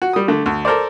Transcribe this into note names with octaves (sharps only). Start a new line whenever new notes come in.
F#4
G3 D#6
D3 A3
D2
A4 A#4 C5 D5